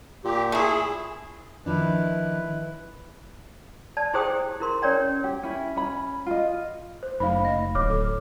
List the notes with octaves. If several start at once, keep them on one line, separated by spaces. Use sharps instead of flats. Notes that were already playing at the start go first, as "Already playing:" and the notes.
A#2 G4
A3 E4 G#4
D#3 F3 D4 E4 B4
D5 A5
E4 G4 G#4 C5 G5 D#6
E4 A#4 C6
C#4 A#4 C#5 D5 G5
G4
C#4 E4
C#4 B5
F4 D#5
C5
F#1 A3 D#4 C5 B5
D#5 A#6
D1 C#5 D6 F6
A4